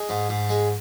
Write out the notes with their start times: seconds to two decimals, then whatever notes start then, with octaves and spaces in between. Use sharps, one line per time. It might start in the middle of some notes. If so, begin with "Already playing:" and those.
Already playing: G#3
0.09 G#2
0.29 G#2
0.50 G#3